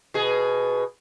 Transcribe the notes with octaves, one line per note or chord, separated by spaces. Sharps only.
B2 G#4